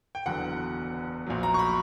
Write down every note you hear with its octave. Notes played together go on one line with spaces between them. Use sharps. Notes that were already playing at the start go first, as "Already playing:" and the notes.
G5
F#1 E2 D3 F#3 F#5
A#1 A#2 F#3
A#5
C#6
B5